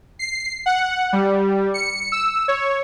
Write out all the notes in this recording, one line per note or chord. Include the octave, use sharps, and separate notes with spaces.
C7
F#5
G3
C#7
E6
C#5